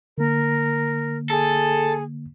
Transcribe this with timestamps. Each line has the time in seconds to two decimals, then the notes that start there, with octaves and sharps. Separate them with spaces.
0.18 D3 A#3 A#4
1.30 G#4 A4